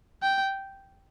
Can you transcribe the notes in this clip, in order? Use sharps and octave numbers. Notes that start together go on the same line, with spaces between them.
G5